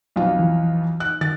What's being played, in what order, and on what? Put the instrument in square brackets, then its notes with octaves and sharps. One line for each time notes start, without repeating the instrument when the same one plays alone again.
[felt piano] B1 F2 F4
[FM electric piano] E3
[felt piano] F#6
[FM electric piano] D#3 [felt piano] A6